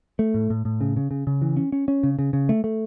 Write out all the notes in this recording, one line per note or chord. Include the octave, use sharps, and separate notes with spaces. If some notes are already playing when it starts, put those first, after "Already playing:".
A3
A2
A2
A2
C#3
C#3
C#3
C#3
E3
C#4
C#4
C#4
C#3
C#3
C#3
A3
A3